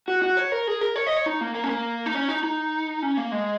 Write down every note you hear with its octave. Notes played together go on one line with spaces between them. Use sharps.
F#4
F#4
C#5
A#4
G#4
A#4
C#5
D#5
C#5
D#4
A#3
A#3
C#4
A#3
D#4
C#4
D#4
D#4
C#4
A#3
G#3